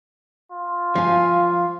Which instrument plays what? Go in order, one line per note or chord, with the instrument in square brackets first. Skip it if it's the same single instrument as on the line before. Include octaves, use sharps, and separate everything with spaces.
[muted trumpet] F4
[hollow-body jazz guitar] F3 [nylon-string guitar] F5 G#5